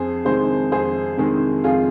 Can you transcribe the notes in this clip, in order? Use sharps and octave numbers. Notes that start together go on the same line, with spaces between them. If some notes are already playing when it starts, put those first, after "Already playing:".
Already playing: F2 G#4 C5
C3 D#3 G#3 G#4 C5
F2 G#4 C5
C3 D#3 G#3
F2 F4 G#4